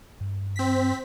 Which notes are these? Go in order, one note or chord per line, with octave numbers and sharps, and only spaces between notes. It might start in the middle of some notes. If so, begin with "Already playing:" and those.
G2
C4 B6